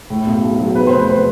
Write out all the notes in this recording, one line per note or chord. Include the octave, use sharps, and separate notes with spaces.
A2
B1
B1
F#3
E2 B4
F1 C5
B4
C5